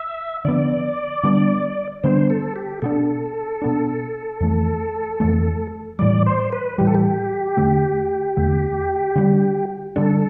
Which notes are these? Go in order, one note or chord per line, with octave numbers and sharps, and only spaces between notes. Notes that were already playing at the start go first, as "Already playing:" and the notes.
Already playing: E5
D3 F3 B3 D5
D3 G3 B3 D4
D3 G3 B3 D4 C5
A4
G4
B2 B3 D4 A4
B2 B3 D4
F2 E3 A3
F2 E3 A3
A2 E3 G3 D5
C5
B4
A2 E3 G3 G4
A4
G4
E2 D3 A3
E2 D3 A3
D3 G3 D4
D3 G3 D4 A4